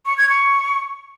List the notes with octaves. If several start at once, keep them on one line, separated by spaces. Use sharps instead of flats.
C#6
G#6
C#6